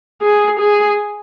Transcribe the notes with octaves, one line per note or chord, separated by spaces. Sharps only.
G#4
G#4